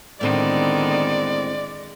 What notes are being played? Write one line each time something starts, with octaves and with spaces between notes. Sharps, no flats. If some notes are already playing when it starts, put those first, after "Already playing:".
A2 D3 D#3 G#3 B3 C4 D5